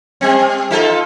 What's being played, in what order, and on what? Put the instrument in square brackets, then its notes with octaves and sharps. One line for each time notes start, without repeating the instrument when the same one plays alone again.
[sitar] G3 C4
D#4 F4 A4